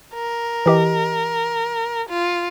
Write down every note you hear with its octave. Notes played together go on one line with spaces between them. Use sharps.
A#4
E3 G4 D#5
F4